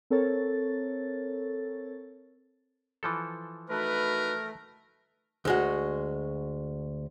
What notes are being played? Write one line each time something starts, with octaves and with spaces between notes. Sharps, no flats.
C4 A4 A#4 C#5 A6
E3 F3 A4
A3 D#4 F#4 A#4 B4
D2 G#3 F#4